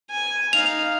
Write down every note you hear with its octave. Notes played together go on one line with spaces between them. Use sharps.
G#5
D#4 F5 F7